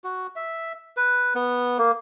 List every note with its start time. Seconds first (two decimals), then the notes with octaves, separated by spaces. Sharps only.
0.04 F#4
0.36 E5
0.97 B4
1.35 B3
1.79 A#3